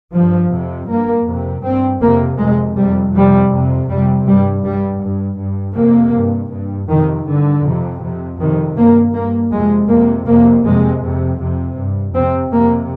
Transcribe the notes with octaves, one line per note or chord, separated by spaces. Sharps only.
G2 F3
F2 C3
G2 A#3
F2 C3
G2 C4
F2 C3 A#3
F2 C3 G#3
F2 C3 G3
F2 C3 G3
F2 C3
F2 C3 G3
G2 G3
G2 G3
G2
G2
F2 C3 A#3
G2
G2
F2 C3 D#3
G2 D3
F2 C3
F2 C3
F2 C3 D#3
G2 A#3
G2 A#3
F2 C3 G#3
F2 C3 A#3
F2 C3 A#3
F2 C3 G#3
F2 C3
F2 C3
G2
F2 C3 C4
F2 C3 A#3